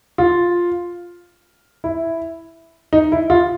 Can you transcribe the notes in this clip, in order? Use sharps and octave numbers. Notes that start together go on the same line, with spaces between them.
F4
E4
D#4
E4
F4